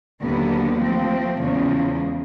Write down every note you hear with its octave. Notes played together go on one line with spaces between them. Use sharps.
D#2 D3 F#3 B3
F3 A3 C4
E2 C#3 F3 G#3